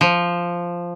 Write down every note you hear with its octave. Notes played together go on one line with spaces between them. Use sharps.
F3